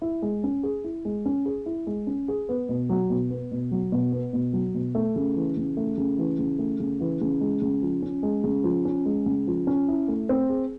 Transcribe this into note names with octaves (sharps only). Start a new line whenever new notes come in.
E4
G#3
C#4
G#4
E4
G#3
C#4
G#4
E4
G#3
C#4
G#4
B3
B2
F#3
B2
B3
B2
F#3
B2
B3
B2
F#3
B2
A3
C#3
E3
C#3
A3
C#3
E3
C#3
A3
C#3
E3
C#3
G#3
C#3
F3
C#4
G#3
C#3
F3
C#4
G#3
C#3
F3
C#4
E4
A3
C4
G#4